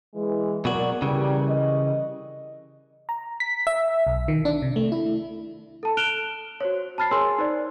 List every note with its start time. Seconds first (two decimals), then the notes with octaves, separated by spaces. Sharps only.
0.14 E3 G#3
0.65 B2 F#3 F#4 A#4 D5
1.02 C#3 E3 G3 A#4
1.49 D#5
3.09 A#5
3.40 B6
3.67 E5
4.07 B1
4.28 D#3
4.45 D4
4.62 C3
4.76 A3
4.92 E4
5.83 A4 A5
5.97 F6 F#6 D7 E7 F7 G7
6.60 F#4 C5 C#5
6.98 A5 B5 F6 A6 C7
7.11 G#4 A#4 C#5 G#5 C6 E6
7.38 D#4 C5 D5